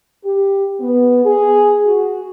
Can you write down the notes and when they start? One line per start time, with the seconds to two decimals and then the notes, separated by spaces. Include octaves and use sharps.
0.24 G4
0.80 B3
1.25 G#4
1.85 F#4